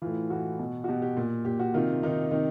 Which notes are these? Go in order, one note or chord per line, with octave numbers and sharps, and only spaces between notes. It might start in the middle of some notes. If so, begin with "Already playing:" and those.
A2 E3 F4
A2 E3 F#4
B2
F#4
B2 G4
G4
A#2
A#2 G4
F#4
C3 D#3 F4
C3 D#3 D#4
C3 D#3